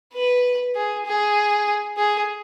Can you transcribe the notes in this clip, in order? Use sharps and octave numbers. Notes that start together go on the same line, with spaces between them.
B4
G#4
G#4
G#4